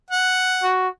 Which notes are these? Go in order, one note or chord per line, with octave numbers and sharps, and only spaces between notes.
F#5
F#4